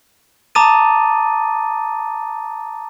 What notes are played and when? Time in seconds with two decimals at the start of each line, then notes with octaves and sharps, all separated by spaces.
0.55 A5 A#5 D6 D#6 A6 D#7